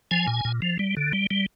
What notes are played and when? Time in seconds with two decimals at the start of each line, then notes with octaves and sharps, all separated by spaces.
0.11 F3 G#5
0.28 A#2
0.45 A#2
0.62 F3
0.79 G3
0.97 D3
1.13 G3
1.31 G3